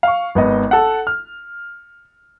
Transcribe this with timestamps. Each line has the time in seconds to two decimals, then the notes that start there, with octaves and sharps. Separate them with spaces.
0.03 F5 C#6
0.35 G#1 B3 D#5
0.71 A4 F#5
1.07 F6